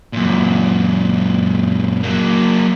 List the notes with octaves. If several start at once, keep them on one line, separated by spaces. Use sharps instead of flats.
F#2 A#2
F#3 A#3